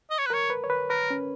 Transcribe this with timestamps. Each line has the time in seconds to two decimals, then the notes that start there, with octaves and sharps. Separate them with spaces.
0.11 D#5
0.18 C#5
0.26 B4
0.30 A#4 C#5
0.50 B4
0.64 C#5
0.70 B4
0.90 A#4 B4
1.10 C#4